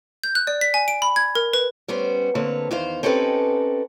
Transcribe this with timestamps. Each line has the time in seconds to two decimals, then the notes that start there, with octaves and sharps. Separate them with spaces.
0.24 G6
0.35 F#6
0.47 D5
0.61 B6
0.74 G#5
0.88 D7
1.02 B5
1.16 G#6
1.35 A#4
1.53 B4
1.88 G3 B3 C#4 C5
2.35 D3 A#3 C4 B4 C#5
2.71 E2 D#3 C5 F5
3.03 C4 C#4 D#4 G4 A4 B4